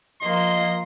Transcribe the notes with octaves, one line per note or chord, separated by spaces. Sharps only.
F3 A#3 D#5 C6